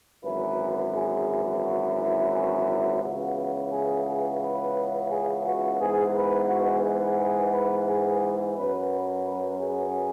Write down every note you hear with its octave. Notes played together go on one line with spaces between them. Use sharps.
G#1 F#2 E3 B4
G#4
F#4
E4
C#4
E4
C#2 C#3 E3 B3 F#4
G#4
G#4
B4
G#4
F#4
G#2 E3 B3 G#4
B4
F#4
G#4
G#4
B4
G#4
F#2 F#3 B3 B4
B4
B4
G#4